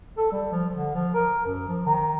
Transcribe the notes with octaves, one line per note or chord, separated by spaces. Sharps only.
A4
G3
F3
D3
F3
A#4
F#2
F3
D#3